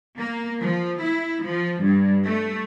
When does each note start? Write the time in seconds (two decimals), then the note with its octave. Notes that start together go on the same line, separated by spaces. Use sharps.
0.18 A#3
0.60 F3
1.02 E4
1.45 F3
1.82 G2
2.24 A3